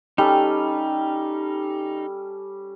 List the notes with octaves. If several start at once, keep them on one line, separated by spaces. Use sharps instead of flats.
G3 C#4 D#4 A4